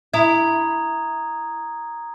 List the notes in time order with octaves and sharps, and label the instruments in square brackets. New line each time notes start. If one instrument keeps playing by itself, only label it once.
[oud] E4 [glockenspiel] A#5 D#6 G#6